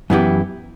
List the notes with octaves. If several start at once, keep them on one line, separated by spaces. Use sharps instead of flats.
F#2 E3 B3 E4 G4